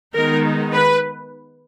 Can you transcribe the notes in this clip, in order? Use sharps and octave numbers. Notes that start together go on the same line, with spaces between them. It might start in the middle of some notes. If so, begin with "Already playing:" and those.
D#3 G#3 B3 D#4 A#4
B4